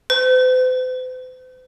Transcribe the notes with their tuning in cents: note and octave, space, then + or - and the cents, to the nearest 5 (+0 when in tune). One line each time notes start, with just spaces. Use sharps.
C5 -45